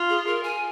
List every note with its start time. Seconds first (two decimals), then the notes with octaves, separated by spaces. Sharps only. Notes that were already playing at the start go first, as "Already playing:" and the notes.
Already playing: F4
0.09 G#4
0.27 A#4
0.43 G#5